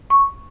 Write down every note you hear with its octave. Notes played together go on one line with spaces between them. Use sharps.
C#6